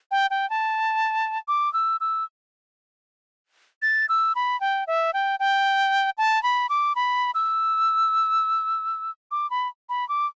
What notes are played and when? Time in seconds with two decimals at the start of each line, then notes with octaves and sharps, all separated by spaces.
0.11 G5
0.30 G5
0.50 A5
1.48 D6
1.73 E6
2.01 E6
3.82 A6
4.09 E6
4.35 B5
4.60 G5
4.87 E5
5.14 G5
5.40 G5
6.18 A5
6.43 B5
6.69 D6
6.96 B5
7.35 E6
9.31 D6
9.50 B5
9.89 B5
10.09 D6